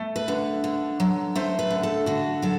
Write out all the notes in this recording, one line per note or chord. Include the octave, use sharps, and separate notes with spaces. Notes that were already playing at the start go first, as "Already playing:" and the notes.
Already playing: A3
B4
D3
D3
F#3
A3 C5
B4
D3
A4
D3 F#4
F#3 A4